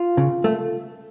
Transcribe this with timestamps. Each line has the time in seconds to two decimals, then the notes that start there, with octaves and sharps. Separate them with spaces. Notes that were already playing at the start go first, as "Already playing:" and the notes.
Already playing: F4
0.17 C#3
0.44 A3